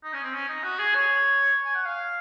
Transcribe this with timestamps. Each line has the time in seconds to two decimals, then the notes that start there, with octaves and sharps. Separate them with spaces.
0.04 D#4
0.13 C#4
0.23 C4
0.34 C#4
0.49 D#4
0.63 F#4
0.79 G#4
0.95 C#5
1.65 G#5
1.75 F#5
1.85 F5